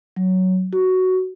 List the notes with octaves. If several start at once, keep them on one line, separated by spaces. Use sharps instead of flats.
F#3
F#4